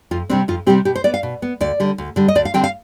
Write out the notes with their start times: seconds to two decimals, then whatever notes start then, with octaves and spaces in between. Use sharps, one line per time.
0.11 F2 F4
0.30 C3 G3 C4 D4
0.48 F2 F4
0.66 C3 G3 C4 G4
0.85 B2 G4
0.95 C5
1.04 B3 D5
1.14 F5
1.23 B2
1.42 B3
1.61 D2 D5
1.80 D3 G3
1.98 D2
2.16 D3 G3
2.28 D#5
2.35 D2 D5
2.45 F5
2.54 D3 G3 C4 G5
2.64 F5